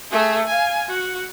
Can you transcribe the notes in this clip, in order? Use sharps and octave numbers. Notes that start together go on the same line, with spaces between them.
A3 G#4
F5 G#5
F#4